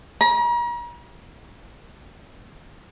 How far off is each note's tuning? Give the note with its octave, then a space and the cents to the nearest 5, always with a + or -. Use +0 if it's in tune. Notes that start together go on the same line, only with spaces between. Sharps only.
A#5 +40